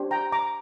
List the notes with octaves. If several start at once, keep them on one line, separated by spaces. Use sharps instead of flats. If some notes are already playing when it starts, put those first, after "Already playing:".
Already playing: D4 G4 C5
G5 A#5
A#5 D6